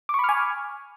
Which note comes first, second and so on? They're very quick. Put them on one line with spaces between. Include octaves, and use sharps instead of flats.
D6 C#6 B5 F6 G#5